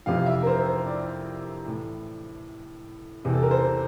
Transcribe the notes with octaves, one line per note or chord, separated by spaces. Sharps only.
F2 C3 E3 F5
E5
A#4
C5
C5
D5
A2 E3
E2 C3 E3
A4
A#4
C5